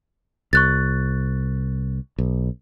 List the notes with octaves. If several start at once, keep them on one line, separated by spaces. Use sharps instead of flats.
C2 C#6 F#6 A6
B1